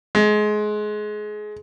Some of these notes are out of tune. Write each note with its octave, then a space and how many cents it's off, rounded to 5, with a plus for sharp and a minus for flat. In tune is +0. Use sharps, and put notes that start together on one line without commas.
G#3 +25